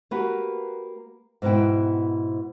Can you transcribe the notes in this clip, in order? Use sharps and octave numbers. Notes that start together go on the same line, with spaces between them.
A#3 F#4 G4 B4
G#2 B2 B3 E4 G5